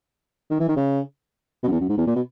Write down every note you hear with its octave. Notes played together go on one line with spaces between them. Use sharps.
D#3
E3
D#3
C#3
B2
F#2
E2
F#2
G#2
E2
A#2
B2